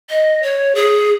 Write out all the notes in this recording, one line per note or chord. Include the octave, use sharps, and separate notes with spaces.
D#5
C#5
G#4